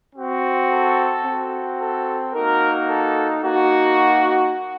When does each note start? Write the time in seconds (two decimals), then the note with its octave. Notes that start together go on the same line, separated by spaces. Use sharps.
0.14 C4 F#4
0.69 A4
1.23 C4 F#4
1.79 A4
2.33 A#3 D#4 F#4 A#4
2.89 A4
3.43 A#3 D#4 F#4